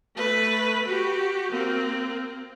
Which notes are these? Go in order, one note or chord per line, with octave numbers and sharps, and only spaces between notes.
A3 B4
F#4 G4
A#3 C4